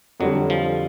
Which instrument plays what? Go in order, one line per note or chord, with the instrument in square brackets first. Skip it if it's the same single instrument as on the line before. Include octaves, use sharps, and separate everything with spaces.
[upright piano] F2 D3 G3 [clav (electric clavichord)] F#3
[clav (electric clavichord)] F3